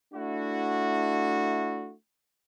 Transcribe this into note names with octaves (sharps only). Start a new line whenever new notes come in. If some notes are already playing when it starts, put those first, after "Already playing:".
A3 D4 E4 F#4